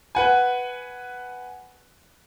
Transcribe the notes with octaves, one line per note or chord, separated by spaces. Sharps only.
B4 F#5 G#5